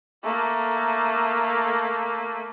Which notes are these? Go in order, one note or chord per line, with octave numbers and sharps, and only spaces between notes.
A3 A#3